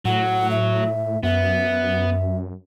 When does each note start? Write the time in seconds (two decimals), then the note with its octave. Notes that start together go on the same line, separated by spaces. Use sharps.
0.05 A2 F#3 F#5
0.51 E5
1.23 F#2 B3 E5